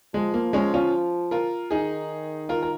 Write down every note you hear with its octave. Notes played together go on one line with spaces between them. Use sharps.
F3 G#3
A#3
G#3 C#4
C#4 F4
F4 A#4
D#3 D#4 G#4
F4 A#4
A#4